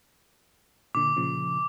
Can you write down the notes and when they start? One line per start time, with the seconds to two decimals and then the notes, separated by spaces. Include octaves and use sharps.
0.95 A#2 D3 D6
1.16 A#2 C#3 F3